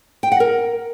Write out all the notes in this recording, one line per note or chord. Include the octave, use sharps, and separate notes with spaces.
G5
F#5
A#4